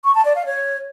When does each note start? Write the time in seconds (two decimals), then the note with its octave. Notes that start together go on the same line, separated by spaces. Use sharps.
0.04 C#6
0.15 A5
0.25 D5
0.35 F5
0.46 C#5